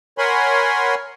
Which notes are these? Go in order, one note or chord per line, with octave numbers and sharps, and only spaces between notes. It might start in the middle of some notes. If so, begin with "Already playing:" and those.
A#4 C#5 F#5 G#5 B5 C6